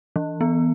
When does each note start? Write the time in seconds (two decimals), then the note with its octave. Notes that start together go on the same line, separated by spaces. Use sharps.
0.16 E3
0.41 B3